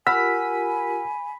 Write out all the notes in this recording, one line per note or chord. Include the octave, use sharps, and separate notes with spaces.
F4 G4 A#4 F#5 G#5 B5 E6 F6